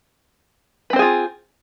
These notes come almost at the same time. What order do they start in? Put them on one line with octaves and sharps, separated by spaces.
B4 C4 C5 G#4 F4